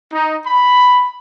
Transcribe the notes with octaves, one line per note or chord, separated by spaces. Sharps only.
D#4
B5